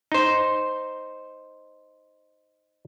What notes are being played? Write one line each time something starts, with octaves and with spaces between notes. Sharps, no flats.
D#4 C5